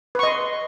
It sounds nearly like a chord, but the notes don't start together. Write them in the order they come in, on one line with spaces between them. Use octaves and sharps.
B4 C#6 D#5 C6